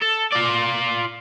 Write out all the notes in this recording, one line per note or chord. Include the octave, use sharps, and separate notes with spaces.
A4
F4 D5